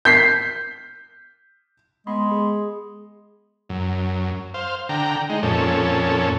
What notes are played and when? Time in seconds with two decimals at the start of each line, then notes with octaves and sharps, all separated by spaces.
0.05 G6 B6 C7
2.07 G#3 B3 B5 C6
2.32 G#4
3.69 F#2
4.54 C5 F5
4.89 D3 G5 A#5
5.29 G#3 D#4
5.43 F2 A#2 C#4 A4